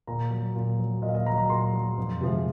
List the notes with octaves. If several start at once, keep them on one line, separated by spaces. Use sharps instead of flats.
A#2 A#5
F#3
A#2
F#3
A#2 D#5
F5
D#5
F#3 A#5
A#5
A#2 C6
F#3
F2
C3 F3 G#3